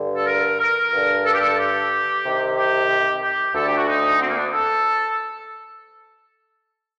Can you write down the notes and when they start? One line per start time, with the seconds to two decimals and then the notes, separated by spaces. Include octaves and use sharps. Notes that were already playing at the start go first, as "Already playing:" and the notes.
Already playing: G2 D3
0.17 A4
0.27 A#4
0.60 A#4
0.92 G2 D3
1.25 A4
1.33 G4
1.41 A4
1.58 G4
2.24 C2 C3 D#3
2.56 G4
3.22 G4
3.55 D2 D3 A4
3.66 G4
3.77 F#4
3.88 D#4
4.21 C4
4.29 A#3
4.37 D4
4.53 A4